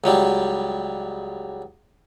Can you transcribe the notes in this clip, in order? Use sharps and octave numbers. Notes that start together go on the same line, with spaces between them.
C#2 F#3 G3